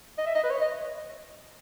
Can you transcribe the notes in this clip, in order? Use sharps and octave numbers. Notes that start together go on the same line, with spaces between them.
D#5
E5
D#5
B4
C#5
D#5